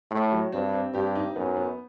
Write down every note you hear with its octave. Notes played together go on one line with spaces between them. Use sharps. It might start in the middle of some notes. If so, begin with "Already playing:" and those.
A2 A3
F#3
G2 C4
C4
G2 G4
D#4
F#2 B3
B3